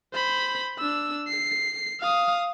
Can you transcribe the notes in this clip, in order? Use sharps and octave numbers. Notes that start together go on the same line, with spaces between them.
C5 B5
D4 E6
C7
F5 D#6